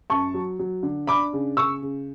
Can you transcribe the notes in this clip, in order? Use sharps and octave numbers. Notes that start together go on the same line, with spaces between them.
F#2 A5 C#6
F#3
F#3
D3
D4 B5 D6
C#3
C#3 C#6 E6
C#3